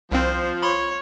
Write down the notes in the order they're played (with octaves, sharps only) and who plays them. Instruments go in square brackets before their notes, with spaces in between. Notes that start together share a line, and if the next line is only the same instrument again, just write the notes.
[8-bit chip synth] C2 C4 [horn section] F3 [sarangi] C5
[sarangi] C#5 [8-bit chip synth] B5 C6